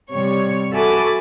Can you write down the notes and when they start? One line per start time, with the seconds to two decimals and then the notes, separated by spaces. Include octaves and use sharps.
0.11 C3 G3 C#5 C#6
0.73 F#4 A4 E5 G#5 B5 D6